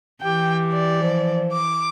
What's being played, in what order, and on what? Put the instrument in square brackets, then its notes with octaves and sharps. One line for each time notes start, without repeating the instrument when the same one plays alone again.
[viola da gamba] E3 [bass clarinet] G4 [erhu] G5
[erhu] D5
[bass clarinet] F3
[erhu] D6